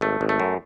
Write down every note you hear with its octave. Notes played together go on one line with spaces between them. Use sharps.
G#1 A3
G#1
A3
F#2